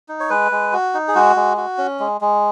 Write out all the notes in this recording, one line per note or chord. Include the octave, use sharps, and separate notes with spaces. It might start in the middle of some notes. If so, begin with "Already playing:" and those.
D#4
C#5
G#3 B4
G#3
F#4
D#4
G#4
G#3 F#4
G#3
F#4
C#4
G#3
G#3